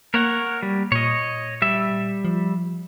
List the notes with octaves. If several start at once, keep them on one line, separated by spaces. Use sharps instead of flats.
A#3 A#4 C#5 F#5
G3
A#2 C#5 D#5
G3 E5
F3